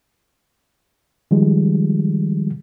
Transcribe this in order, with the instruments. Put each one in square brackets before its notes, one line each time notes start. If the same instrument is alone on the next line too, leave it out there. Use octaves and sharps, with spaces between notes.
[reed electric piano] D#3 F3 G3 G#3